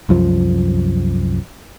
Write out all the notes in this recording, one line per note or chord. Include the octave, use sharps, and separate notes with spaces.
C2 F#2 F3